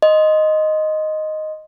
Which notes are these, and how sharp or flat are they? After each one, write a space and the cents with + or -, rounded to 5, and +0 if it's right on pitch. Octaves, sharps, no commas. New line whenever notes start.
D#5 +0 C6 +0